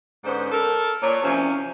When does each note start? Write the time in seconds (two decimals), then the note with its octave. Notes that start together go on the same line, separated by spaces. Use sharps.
0.24 G#2 D3 B3 C#4 C5
0.52 A4 A#4
1.02 A#2 C#5
1.22 C3 E3 F3 C#4